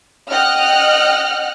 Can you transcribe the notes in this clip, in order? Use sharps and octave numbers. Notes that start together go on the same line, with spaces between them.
D#5 F#5 G5 F6 F#6